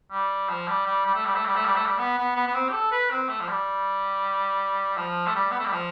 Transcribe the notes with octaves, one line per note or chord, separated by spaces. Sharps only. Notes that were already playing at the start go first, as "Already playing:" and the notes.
G3
F3
G3
G3
G3
A3
G3
A3
G3
A3
G3
A3
G3
B3
B3
B3
B3
C4
G4
A4
B4
C4
A3
F3
G3
F3
A3
G3
B3
A3
G3
F3